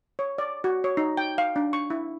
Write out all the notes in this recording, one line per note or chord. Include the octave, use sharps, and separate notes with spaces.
C#5
D5
F#4
C#5
D#4
G5
F5
D4
C#6
E4